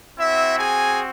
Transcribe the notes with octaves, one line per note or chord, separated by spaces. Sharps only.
C4 E4 F#4 E5
G#4 G#5